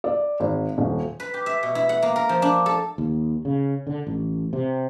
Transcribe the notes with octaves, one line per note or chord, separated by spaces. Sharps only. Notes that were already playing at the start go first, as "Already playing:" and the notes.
D5
G#1
D#1
B4
G4
E5
B2
E4
F#5
A#3
A#4
F3
D4
A4
D#2
C#3
D3
A1
C3